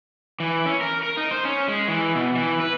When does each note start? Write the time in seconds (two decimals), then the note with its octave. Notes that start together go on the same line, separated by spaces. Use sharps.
0.40 E3
0.66 C#4
0.81 A#4
1.03 A#4
1.17 D#4
1.31 C5
1.45 C#4
1.68 G#3
1.88 E3
2.15 B2
2.35 E3
2.60 B4